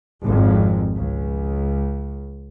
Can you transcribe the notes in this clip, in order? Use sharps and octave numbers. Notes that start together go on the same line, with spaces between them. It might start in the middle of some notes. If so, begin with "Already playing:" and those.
G#1 F2
C#2